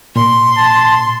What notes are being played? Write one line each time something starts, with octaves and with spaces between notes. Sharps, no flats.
A#2 C6
A5